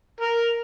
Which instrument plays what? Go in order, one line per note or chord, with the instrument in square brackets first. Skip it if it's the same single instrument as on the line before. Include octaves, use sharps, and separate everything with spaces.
[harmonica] A#4